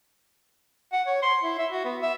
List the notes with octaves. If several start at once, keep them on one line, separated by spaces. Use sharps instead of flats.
F#5
C#5
C6
E4
E5
F#4
B3
E5